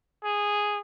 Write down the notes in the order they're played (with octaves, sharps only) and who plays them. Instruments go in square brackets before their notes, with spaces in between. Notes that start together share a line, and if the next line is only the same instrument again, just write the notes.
[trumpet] G#4